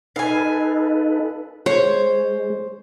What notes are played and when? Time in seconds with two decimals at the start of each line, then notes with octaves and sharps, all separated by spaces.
0.16 D#4 A4 B4 F5 G#5
1.66 G#3 C5 C#5